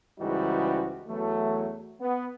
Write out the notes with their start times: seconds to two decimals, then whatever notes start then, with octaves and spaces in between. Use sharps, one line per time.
0.20 C#2 G#2 E3 G3 D#4 F#4
1.09 E2 E3 F#3 A3
2.00 B3